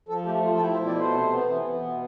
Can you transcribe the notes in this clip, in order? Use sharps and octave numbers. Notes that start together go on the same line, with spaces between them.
F3 A4
A3 G4
F3 F4
A4
E4 G4
C5
B2
D5
A3 C5
C3
B3
E3
B3
B2